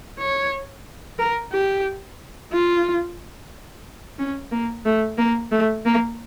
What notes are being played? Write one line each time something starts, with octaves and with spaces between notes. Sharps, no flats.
C#5
A#4
G4
F4
C#4
A#3
A3
A#3
A3
A#3